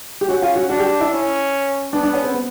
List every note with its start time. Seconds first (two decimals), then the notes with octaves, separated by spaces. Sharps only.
0.21 G4
0.28 C#4 F#4
0.42 F4
0.56 F#4
0.69 D4 F#4
0.80 G4
1.01 E4
1.11 C#4
1.93 B3 D4
2.03 D4
2.14 C#4
2.24 C4
2.34 B3